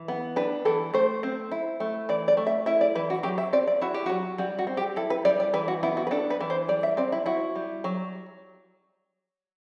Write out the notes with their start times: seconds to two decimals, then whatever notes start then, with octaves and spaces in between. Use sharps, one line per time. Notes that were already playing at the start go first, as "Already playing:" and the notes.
Already playing: E3
0.08 B3
0.36 D4 B4
0.65 E3 A4
0.94 A3 C5
1.23 C4
1.51 E4
1.80 A3
2.09 E3 D5
2.28 D5
2.37 A3
2.47 E5
2.66 E4 E5
2.81 D5
2.95 E3 B4
3.10 F#4
3.23 F#3 G4
3.38 E5
3.53 C4 D5
3.67 D5
3.81 E4 F#4
3.94 G4
4.06 F#3 F#4
4.38 G3 F#4
4.59 F#4
4.67 C4
4.77 G4
4.96 E4 A4
5.10 B4
5.25 G3 D5
5.40 D5
5.54 E3 B4
5.68 F#4
5.83 B3 E4
5.97 F#4
6.07 B4
6.11 D4 A4
6.30 B4
6.41 E3
6.50 C5
6.68 G3 D5
6.83 E5
6.97 C4 D5
7.12 E4
7.26 E4 F#4
7.55 G3
7.84 F#3